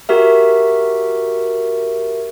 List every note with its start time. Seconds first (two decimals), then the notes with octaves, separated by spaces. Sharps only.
0.09 F#4 G4 A#4 E5